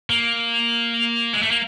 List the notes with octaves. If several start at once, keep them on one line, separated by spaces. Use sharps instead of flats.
A#3
G#3
A3
A#3